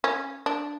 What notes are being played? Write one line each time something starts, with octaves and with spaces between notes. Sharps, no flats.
C#4
D4